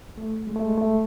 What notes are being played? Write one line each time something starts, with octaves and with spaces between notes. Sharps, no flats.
A3
G#3
A3
G#3
A3